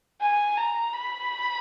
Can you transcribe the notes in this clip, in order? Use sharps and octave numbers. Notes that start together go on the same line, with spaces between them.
G#5
A#5
B5